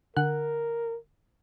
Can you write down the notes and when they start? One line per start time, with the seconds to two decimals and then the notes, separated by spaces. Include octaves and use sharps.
0.16 D3 A#4 F#5 F#6